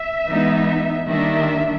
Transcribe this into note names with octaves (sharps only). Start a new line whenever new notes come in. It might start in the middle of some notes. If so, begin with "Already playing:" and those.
Already playing: E5
E3 G#3 B3 D#4
D#3 G3 A#3 D4 E5